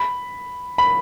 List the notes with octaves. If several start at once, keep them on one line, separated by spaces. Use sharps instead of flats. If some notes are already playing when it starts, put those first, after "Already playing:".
Already playing: B5
B5